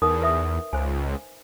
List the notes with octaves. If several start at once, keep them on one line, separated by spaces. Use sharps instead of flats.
E2 D#4 A#4 D#6
B4 E5 D#6
C#2 C5 G#5